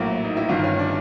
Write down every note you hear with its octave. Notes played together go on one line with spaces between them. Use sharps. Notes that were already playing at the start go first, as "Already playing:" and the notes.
Already playing: A#1 A2 F#3 A#3 E4
D#4
E4
G1 G2 D#3 F4
C#4
D4